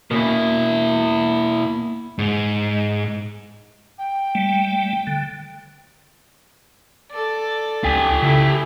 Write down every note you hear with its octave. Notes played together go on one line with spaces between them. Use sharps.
B2 A#3 C#4 E4
G#2
G5
G3 A3
D3
A4 D5
C#2 C#4 G4 G#5
C#3 A3 E4